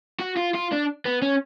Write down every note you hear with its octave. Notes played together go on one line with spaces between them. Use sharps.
F#4
F4
F4
D4
B3
C#4